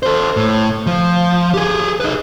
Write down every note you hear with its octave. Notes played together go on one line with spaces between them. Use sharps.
A4 C5
A2
F3
G4 G#4
D#4 B4